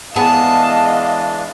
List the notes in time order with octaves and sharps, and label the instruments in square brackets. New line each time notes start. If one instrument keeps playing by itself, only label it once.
[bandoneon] E3 G#3 D4 [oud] B3 G#4 [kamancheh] D#5 F5 [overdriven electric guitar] A5